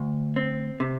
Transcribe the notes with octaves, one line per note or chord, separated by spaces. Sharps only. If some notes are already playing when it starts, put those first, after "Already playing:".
Already playing: D2
C4
C3